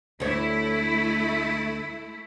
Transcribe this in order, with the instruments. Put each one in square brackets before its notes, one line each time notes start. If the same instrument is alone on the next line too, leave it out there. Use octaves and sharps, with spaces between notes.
[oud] D2 C#5 [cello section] A3 E4